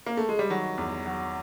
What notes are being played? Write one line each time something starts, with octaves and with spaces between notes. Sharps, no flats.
A#3
A3
G#3
G3
D#3 F#3
E2
F#3